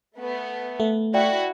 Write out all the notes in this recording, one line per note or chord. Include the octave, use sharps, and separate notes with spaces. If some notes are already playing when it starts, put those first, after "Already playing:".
A3 B3
A3
E4 F#4 D5 E5 G5